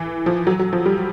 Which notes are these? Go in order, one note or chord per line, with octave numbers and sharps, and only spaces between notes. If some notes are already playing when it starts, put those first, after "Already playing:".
Already playing: E3
F3
F#3
F#3
F3
G3